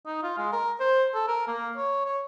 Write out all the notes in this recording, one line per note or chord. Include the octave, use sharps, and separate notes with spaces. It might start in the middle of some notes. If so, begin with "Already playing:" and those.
D#4
F4
G#3
A#4
C5
A4
A#4
A#3
C#5
C#5